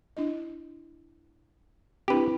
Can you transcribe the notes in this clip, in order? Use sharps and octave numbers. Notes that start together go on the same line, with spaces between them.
D4 E4 D#5
C4 D4 E4 G4 B4